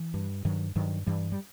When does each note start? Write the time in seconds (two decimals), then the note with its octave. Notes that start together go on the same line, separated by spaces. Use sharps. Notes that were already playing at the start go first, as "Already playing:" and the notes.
Already playing: E3
0.14 G2
0.45 G2 D#3 F#3
0.75 G2 D#3 F#3
1.06 G2 E3 G3
1.32 G3